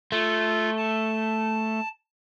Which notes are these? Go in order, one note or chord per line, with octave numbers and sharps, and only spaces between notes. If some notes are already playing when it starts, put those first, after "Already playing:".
A3 F4
A5